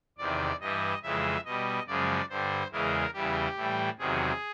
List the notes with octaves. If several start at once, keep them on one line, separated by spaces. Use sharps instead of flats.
E2 C3 D#3 D5
G2 E3 G3 D#5
F2 C#3 E3 G#3 E5
B2 G3 D#5
F#2 C#3 F3 G#3 D5
G2 D3 G3 C5
E2 C#3 E3 G#3 A#4
E2 C#3 E3 G3 G4
A2 E3 G3
E2 C3 D#3 F#3 G#4